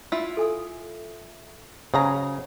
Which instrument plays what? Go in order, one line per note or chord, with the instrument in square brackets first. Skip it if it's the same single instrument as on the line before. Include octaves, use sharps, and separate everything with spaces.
[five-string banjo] E4 F4 E5
[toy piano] A4 G#5 D#6
[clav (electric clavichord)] C#3 [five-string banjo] F#3 G#4 A#5 [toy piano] C5 F5 G#5